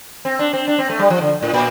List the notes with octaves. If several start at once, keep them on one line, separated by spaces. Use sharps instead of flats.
C4
D4
C4
D4
C4
A3
G3
F3
D3
A2
A#2